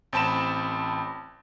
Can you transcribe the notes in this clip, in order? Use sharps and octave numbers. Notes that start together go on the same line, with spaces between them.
A1 C4 A5 B5 E7